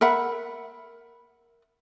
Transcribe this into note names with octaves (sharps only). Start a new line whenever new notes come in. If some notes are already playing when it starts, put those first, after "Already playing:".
A#4 E5 F#5 B5